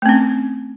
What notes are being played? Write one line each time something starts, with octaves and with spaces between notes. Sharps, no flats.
A3 C4 C#4